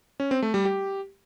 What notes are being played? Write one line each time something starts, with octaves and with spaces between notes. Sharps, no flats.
C#4
C4
A3
G3
G4